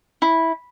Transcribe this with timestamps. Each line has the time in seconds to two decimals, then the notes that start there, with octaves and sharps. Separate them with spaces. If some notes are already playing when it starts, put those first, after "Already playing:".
0.22 E4